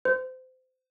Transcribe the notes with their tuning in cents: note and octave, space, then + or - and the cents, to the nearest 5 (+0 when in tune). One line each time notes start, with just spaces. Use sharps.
C5 -30